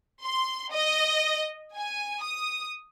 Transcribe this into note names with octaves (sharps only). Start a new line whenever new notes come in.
C6
D#5
G#5
D#6